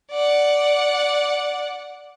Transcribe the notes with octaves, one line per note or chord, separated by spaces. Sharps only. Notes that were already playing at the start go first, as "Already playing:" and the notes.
D5 F#5